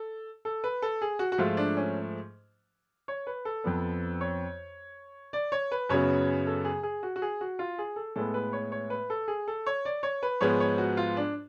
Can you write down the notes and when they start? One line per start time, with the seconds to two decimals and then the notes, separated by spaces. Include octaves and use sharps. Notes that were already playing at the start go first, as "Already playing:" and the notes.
Already playing: A4
0.45 A4
0.64 B4
0.82 A4
1.02 G#4
1.19 F#4
1.32 F#4
1.38 G#2 F3 A3 F4
1.57 D4
1.77 C#4
3.08 C#5
3.27 B4
3.45 A4
3.64 F2 F3 B3
4.21 C#5
5.33 D5
5.52 C#5
5.72 B4
5.89 F#2 C#3 F#3 B3 C#5
6.47 A4
6.65 G#4
6.83 G#4
7.03 F#4
7.16 F#4
7.22 G#4
7.41 F#4
7.59 F4
7.79 G#4
7.96 A4
8.16 A2 G#3 B3 A4
8.34 B4
8.53 C#5
8.72 C#5
8.90 B4
9.10 A4
9.28 G#4
9.48 A4
9.66 C#5
9.85 D5
10.03 C#5
10.23 B4
10.41 G#2 F3 G#3 B3 C#5
10.60 C#5
10.78 F#4
10.97 F4
11.17 D4